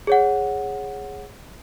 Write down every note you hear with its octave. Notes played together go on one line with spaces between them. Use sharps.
G#4 C#5 F#5